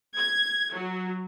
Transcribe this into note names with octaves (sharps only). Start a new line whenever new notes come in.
G#6
F#3